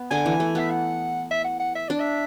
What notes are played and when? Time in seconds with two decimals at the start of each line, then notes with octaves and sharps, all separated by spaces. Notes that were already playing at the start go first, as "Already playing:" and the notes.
Already playing: B3
0.11 D3 G#5
0.26 E3
0.40 A3
0.55 B3 E5
0.70 F#5
1.31 E5
1.44 F#5
1.59 F#5
1.75 E5
1.88 D4 D5
2.00 E5